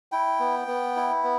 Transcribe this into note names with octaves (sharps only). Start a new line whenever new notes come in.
E4 G5
B3
B3
E4
B3